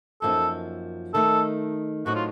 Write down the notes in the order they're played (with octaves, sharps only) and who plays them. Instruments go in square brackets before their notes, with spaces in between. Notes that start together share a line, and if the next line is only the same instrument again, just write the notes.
[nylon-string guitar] F#2 F3 A#3 D#4 [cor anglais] A4
[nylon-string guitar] D#3 A3 D#4 [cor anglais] A4
[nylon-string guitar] A2 F#3 C4 D#4 [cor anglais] F#4
[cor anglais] F4